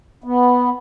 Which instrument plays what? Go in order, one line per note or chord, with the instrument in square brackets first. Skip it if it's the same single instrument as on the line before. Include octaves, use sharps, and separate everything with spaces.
[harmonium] B3